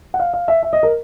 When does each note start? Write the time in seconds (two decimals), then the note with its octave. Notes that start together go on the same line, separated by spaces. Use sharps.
0.14 F#5
0.20 F5
0.33 F5
0.48 E5
0.63 E5
0.73 D#5
0.83 A#4